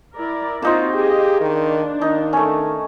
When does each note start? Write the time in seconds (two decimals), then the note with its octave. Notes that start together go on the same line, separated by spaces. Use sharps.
0.17 E4 A#4 D5
0.62 A#3 C4 D#4 F4 F#4 C5
0.94 G4 G#4 D#5
1.40 D#3 D4
2.02 D#3 D#4
2.33 A3 C#4